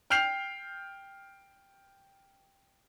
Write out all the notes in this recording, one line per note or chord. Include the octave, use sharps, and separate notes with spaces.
G5 F6 G6 C7 F7